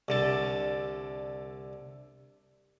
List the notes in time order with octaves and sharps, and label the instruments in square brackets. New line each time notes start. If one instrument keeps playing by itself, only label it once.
[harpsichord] C2 D3 A5